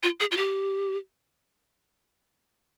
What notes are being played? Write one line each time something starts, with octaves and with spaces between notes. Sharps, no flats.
F4
G#4
F4
G4